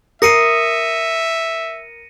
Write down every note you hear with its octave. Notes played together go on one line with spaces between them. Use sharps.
A#4 E5 D#6 A#6 C7 C#7 D#7